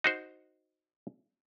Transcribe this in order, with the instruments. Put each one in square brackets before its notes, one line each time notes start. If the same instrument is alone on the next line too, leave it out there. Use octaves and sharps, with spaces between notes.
[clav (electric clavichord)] D#4 F#4 C5